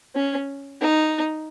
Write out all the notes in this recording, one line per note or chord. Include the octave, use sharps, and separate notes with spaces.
C#4
D#4